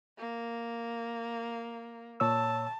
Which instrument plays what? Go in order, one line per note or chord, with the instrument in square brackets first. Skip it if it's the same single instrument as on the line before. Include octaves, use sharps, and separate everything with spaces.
[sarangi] A#3
[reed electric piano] A#2 C#5 E6 [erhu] A5